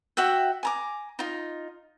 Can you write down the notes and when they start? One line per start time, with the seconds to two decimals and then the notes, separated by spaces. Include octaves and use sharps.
0.17 F#4 E5 F#5 G5
0.63 G#5 A#5 D6
1.19 D#4 F4